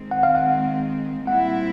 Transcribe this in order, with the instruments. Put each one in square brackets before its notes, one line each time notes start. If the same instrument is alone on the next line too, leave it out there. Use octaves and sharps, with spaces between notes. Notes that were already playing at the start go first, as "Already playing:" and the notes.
Already playing: [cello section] D#3 G#3 C4
[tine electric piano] F#5
F5
F#5
[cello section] A#2 G3 C4 E4 [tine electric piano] F#5